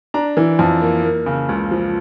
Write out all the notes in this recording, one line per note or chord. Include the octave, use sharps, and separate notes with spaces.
D4 A#5
E3
F2
A#3
A#3
C#3
C#2
F3